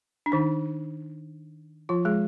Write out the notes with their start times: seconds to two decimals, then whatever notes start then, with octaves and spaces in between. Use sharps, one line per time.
0.26 D4
0.32 D#3 D#4
1.89 F3 F4
2.05 G#3 G#4